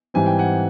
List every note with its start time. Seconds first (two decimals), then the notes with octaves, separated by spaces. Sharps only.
0.14 G#2 E3 G3 C4 G#5
0.26 G5
0.39 F#5 G#5